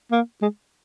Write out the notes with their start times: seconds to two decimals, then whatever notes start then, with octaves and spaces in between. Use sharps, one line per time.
0.12 A#3
0.42 G#3